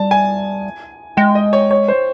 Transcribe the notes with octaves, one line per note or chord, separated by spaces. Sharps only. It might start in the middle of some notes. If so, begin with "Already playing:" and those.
Already playing: G3 A5
G#5
G#3 G5
D#5
C#5
C#5
C5